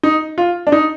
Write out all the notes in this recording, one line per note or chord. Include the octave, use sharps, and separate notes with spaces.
D#4
F4
D4
D#4